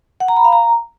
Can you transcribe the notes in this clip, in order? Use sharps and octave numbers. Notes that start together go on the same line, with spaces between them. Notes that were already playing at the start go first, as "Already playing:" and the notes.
F#5
A#5
B5
F5
A#5